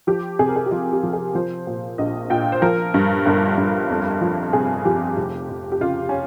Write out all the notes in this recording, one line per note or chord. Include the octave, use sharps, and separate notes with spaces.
F3 G4
C3 G#4
A#4
G#4
G4
F3 F4
G4
F3
G#4
F3 C5
A#2
A#1 D#5
A#2 G5
C5
F3 A#4
G2
G1 A#4
G2
F2
F3
C3 G#4
F3 G4
F1
F1
G4
C#3 F4
C#4